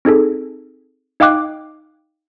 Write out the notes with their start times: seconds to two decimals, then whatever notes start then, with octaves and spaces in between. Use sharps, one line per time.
0.05 C4 D#4 G#4 A4
1.20 D#4 D#5 F5 G5 D6 F#6